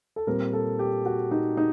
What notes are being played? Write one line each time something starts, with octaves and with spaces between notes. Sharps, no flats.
A4
A#2 G3 C4 A#4
A4
G4
F#4
D#4
D#4